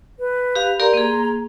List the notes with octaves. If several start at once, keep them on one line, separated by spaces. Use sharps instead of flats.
B4
G4 F5
G4 A#4 D5 A#5 C6
A#3 G#4